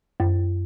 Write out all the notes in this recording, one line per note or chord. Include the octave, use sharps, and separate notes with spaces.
F#2